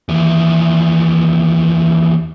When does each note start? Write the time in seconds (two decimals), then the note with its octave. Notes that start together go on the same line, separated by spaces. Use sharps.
0.09 D#2 E3